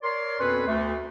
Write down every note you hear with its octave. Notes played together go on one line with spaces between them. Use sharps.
A#4 C#5 D5 C6
F2 B2 B3 C#4 A4 B4
D2 A3